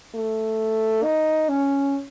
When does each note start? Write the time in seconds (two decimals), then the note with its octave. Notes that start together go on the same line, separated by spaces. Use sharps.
0.15 A3
1.03 D#4
1.49 C#4